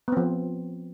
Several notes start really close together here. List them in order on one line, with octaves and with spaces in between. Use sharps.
B3 C4 F3